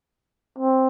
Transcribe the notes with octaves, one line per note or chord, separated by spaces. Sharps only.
C4